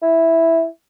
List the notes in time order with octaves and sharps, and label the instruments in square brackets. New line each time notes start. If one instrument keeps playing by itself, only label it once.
[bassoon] E4